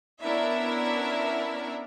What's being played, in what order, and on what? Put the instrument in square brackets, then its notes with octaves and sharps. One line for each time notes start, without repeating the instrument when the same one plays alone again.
[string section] B3 C#4 D4 E4 A#4 E5